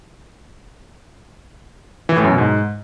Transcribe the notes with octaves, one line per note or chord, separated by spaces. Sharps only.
E3
A2
F#2
B2
G#2